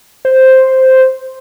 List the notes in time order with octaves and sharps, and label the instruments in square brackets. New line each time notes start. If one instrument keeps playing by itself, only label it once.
[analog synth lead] C5